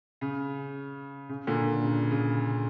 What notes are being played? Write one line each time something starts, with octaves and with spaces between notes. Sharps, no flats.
C#3
C#3
A#2 D3
C#3
C#3